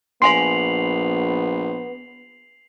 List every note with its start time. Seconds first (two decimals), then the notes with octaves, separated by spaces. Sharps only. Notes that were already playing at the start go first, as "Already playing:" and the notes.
0.22 A#1 B3 F5 G#5 C6 C7 F7 F#7